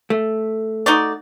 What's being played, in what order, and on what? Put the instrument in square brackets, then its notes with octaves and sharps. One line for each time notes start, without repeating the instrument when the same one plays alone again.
[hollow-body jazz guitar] A3
[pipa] D#4 F#4 D5